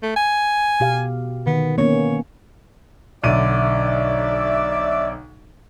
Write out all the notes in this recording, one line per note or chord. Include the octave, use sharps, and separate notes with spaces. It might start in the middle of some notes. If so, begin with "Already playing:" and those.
A3
G#5
B2 G4 F5
D3 D#3 B3
A#3 B3 C#4 C#5
B1 D3 D5 E5 D#7